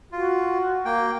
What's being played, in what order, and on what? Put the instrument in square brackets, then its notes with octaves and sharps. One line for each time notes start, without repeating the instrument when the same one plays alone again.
[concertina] F4 [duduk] F#4
[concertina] A#3 G5